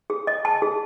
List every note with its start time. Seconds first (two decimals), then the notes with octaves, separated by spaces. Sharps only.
0.10 G#4
0.27 D#5
0.45 A5
0.62 G#4